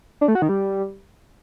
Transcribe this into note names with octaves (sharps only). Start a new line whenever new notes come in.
D4
A3
F#4
D#3
G3